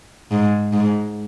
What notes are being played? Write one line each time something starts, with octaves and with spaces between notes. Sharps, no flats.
G#2
G#2